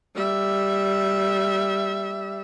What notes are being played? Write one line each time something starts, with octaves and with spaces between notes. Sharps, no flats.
G3 E5